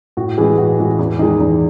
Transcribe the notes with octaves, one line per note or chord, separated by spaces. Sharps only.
A2 F#4
E3 G#3 G#4
A2 F#4
E3 G#3
E2
D#3 G#3 D#4
E2